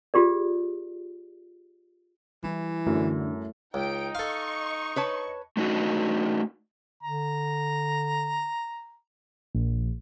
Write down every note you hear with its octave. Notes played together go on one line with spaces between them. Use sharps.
F4 G4 G#4 D5
E3 G3 E4
F#2 D3 A3 E4
C#2 D#4 G5 D7
A4 D#5 F5 C#6
B4 C#5 A5
A3 D4 D#4 F#4 D#5
D3 A#5
A#1